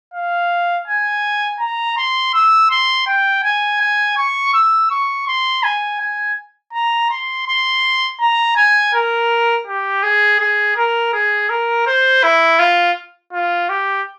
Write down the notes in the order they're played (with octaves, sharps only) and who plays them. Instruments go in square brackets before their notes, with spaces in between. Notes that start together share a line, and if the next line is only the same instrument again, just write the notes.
[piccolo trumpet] F5
G#5
A#5
C6
E6
C6
G5
G#5
G#5
C#6
E6
C#6
C6
G#5
G#5
A#5
C6
C6
A#5
G#5
A#4
G4
G#4
G#4
A#4
G#4
A#4
C5
E4
F4
F4
G4